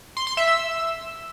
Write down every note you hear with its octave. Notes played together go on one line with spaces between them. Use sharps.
C6
C6
E5
E6